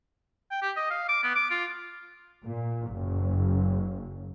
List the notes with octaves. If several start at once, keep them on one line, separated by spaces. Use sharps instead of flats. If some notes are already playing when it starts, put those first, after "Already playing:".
G5
G4
D#5
F5
D6
B3
D6
F4
A#2
F#1